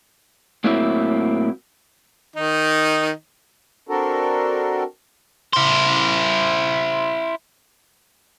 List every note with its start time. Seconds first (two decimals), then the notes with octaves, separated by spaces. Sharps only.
0.64 A2 F#3 A#3 C4 E4
2.36 D#3 D#4
3.88 C4 D4 F#4 A4 A#4
5.53 E4 C5